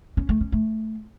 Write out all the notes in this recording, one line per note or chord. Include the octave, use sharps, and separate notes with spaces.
C#4
A3
C#4
A3